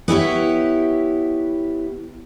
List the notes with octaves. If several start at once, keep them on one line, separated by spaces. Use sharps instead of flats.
B3 E4 G4 C#5